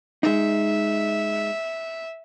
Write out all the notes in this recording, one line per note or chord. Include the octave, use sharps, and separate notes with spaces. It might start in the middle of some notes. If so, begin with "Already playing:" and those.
G#3 D#4 E5